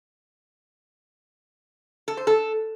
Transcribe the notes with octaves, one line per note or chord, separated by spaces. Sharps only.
A4
C5
A4